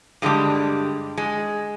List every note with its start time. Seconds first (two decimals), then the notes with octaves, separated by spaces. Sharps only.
0.22 G2 D3 G3 G#3
1.18 G#3